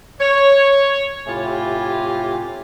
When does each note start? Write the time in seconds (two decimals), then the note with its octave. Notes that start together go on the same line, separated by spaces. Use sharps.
0.21 C#5
1.27 A2 C3 E4 F4 G4 G#5